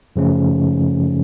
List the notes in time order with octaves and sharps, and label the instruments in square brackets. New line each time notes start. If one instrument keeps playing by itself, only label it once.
[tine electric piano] F#2 C#3 F3 A3 C#4